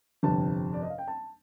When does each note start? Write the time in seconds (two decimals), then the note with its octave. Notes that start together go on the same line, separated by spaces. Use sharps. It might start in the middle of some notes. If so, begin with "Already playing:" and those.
0.23 G1 F2 C3 A5
0.73 D5
0.82 D#5
0.90 F5
0.98 G5
1.07 A5